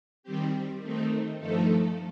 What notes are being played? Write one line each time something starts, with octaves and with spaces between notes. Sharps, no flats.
D#3 G3 C4 G4
D#3 A3 C4 D#4
G2 F3 A3 D#4 A4